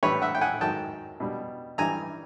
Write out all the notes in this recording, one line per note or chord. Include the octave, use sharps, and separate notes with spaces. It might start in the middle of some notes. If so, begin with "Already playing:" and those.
A2 E3 G3 B4 C#5
E5 F#5
G5
F#5 G#5
G#2 D#3 F#3 G5 A5
B2 G3
G2 E3 G3 G#5 A#5